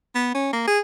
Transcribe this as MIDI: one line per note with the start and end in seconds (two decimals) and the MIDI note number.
0.15 0.31 59
0.35 0.52 61
0.53 0.67 58
0.68 0.79 68